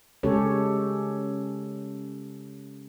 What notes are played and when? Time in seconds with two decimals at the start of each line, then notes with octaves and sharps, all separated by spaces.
0.23 C#3 G#3 C#4 G4 A4 C#5